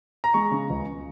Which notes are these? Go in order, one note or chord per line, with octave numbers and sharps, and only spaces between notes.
A#5
G#3 C#6
C#3
C#2